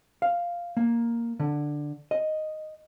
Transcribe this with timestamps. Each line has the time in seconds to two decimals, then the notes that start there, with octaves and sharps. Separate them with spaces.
0.22 F5
0.77 A#3
1.40 D3
2.11 D#5